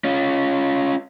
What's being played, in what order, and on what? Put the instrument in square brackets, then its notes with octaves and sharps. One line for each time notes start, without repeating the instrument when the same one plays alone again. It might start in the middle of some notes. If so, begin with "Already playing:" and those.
[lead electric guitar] C#4 F4